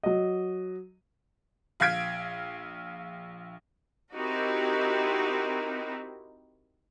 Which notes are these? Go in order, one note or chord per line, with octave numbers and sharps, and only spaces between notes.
F#3 D#5
A#1 F5 F6 G#6 B6 D7
C4 D#4 E4 F#4 G4 A#4